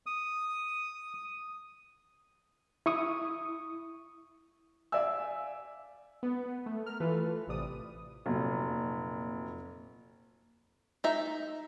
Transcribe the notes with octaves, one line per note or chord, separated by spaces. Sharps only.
D#6
E4 C#6 D#6
D5 E5 F5 G#5 E6
B3
A3
A#4 F6
E3 A3 F4 A4 B4
A1 C3 D5 D#6
F1 A#2 F#3
D#4 E5